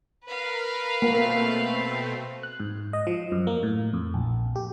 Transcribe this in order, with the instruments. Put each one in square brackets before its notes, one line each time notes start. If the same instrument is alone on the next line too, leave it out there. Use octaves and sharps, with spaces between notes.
[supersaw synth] A#4 B5 [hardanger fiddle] B4 F5
[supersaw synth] B2 A3 C4 [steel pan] A#3
[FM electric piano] F#6
G#2
D#5
F3
F#2
A#3
A2
F2
A#1
G4